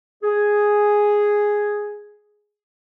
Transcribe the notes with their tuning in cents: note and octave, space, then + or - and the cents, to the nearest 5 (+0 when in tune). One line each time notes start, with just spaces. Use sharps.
G#4 +0